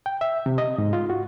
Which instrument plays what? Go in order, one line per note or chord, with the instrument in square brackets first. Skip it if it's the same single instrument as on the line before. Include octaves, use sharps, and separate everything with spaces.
[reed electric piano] G5
E5
C3
D#5
G#2
F4
F#4